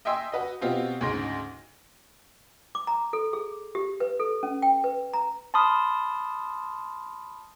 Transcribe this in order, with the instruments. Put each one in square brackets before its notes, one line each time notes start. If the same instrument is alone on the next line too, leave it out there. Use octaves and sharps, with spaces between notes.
[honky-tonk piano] D#5 E5 G5 G#5 C6 E6
F#4 B4 D#5
B2 B3 C4 F4 G4
D2 G#2 C#3 C6 A#6 D7
[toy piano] D6
A#5
A4
G#4
G4
B4
A4
C#4
G5
B4
A#5
[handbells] A5 B5 C6 D#6 F6